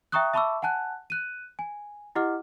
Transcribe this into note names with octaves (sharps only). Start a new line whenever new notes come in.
E5 G5 A#5 C#6 D#6 F#6
E5 A5 B5 C#6 D6 E6
F#5 G#5 A5 F#6
F#6 D#7
G#5
E4 G4 D#5 F#5 D6 F6